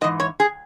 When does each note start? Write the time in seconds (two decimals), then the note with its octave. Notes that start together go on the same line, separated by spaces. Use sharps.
0.01 G#2 E3 D#5
0.20 C#5
0.40 G#4